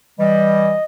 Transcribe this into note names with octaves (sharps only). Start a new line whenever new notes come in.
E3 G3 D#5